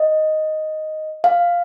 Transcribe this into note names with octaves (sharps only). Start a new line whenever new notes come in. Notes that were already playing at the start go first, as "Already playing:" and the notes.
Already playing: D#5
F5